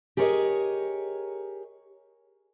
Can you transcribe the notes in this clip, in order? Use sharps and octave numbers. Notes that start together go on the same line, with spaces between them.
G4 G#4 A#4 C#5 D#5